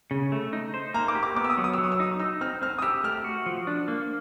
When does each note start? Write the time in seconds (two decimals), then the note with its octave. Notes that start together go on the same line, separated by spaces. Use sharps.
0.11 C#3
0.32 A3
0.53 D#4
0.74 C5
0.94 A#3 A#5
1.08 D6
1.15 G4
1.23 D6
1.36 B3 D6
1.44 E6
1.50 D#6
1.58 F#3
1.64 D#6
1.73 E6
1.78 F#3
1.83 D#6
1.92 E6
2.00 D#4 D#6
2.20 D#4 E6
2.41 C4 F6
2.62 C4 F6
2.78 D#6
2.82 G4 E6
3.04 A3 F6
3.24 F#4
3.46 F3
3.67 D4
3.88 A#3